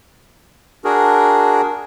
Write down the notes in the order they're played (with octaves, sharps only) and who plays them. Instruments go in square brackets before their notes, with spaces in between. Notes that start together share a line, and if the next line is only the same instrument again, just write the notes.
[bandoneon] D4 F#4 G#4 A#4